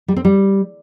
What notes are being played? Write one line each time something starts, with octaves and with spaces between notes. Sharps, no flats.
G3
C4
G3